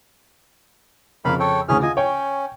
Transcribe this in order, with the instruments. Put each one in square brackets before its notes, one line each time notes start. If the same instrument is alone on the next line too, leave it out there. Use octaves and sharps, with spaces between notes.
[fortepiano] F2 C#3 [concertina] A#3 F5 B5
[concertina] A4 C#5 G5
[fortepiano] D2 C#3 E3 [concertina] C#4 G#4 F6
[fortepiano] F4 [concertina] D#5 G#5
[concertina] C#4 [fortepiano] C#5 G5